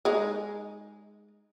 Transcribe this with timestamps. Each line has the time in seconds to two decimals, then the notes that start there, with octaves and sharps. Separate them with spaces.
0.05 G#3 D#4